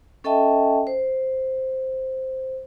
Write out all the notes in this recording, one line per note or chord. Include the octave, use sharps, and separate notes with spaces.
C#4 A4 D#5 E5 G5 A5
C5